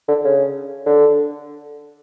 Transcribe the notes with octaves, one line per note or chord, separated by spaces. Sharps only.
D3
C#3
D3